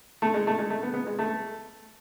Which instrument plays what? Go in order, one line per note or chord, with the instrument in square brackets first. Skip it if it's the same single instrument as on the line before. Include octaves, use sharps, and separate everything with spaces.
[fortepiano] A3
G#3
A3
G#3
A3
B3
B3
G#3
A3